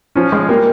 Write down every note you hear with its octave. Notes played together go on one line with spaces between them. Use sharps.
F3 C#4
G#3
G3 A#3